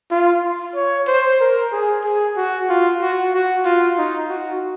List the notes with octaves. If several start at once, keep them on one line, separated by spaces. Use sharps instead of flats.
F4
C#5
C5
A#4
G#4
G#4
F#4
F4
F#4
F#4
F4
D#4
F#4